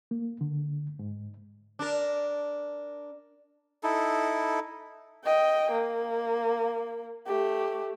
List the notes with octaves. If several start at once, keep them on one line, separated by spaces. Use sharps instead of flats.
A#3
D3
G#2
D4 A#4
D#4 E4 A4
D#5 G5
A#3
A3 G4